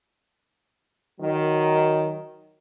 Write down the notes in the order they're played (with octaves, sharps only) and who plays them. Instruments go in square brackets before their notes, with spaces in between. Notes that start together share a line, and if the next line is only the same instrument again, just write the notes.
[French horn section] D#3 F#3